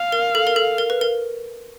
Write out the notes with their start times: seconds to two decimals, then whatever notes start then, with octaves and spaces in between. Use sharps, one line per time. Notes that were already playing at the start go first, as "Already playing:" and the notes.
Already playing: F5
0.12 A#4
0.35 A4
0.47 A#4
0.56 A4
0.78 A#4
0.90 B4
1.01 A#4